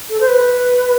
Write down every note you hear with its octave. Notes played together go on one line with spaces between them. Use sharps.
A4
C5
B4